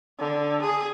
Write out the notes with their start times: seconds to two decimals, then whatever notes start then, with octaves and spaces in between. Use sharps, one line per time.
0.19 D3
0.62 G#4